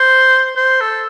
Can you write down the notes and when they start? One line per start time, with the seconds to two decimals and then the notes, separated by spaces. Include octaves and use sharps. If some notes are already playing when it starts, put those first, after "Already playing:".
Already playing: C5
0.56 C5
0.80 A4